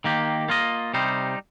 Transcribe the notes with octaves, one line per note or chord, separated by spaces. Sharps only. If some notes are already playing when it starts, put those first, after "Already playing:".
D#3 A#3 G4
A#3 F4 D#5
C3 G3 D#4 C5